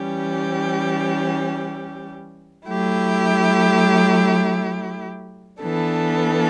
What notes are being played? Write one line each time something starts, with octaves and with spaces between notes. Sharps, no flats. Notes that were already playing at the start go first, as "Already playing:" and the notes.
Already playing: E3 G3 C#4 G4
F#3 A3 E4 G4
E3 B3 D4 A4